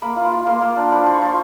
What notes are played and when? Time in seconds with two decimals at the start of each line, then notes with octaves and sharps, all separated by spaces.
0.02 A#3 B5
0.16 F4
0.25 C6
0.32 F4
0.46 A#3 C6
0.62 A#3
0.77 D4
0.92 F3 B5
1.03 F3 C6
1.14 C#6
1.22 F3 C6